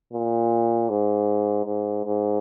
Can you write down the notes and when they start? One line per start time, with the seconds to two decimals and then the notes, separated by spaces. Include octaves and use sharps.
0.13 A#2
0.89 G#2
1.66 G#2
2.05 G#2